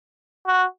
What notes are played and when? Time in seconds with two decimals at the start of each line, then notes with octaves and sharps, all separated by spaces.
0.47 F#4